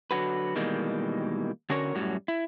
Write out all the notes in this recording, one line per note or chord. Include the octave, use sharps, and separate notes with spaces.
D3 F#3 F#4 B4
B2 D#3 E3 G3 G#3 A#3
D3 C#4 F#4 A#4 C#5
F#2 A2 F#3 G3
E4